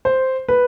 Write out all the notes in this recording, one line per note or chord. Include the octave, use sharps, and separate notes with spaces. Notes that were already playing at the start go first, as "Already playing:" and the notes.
C5
B4